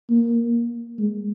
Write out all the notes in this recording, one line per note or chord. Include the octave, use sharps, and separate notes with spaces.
A#3
G#3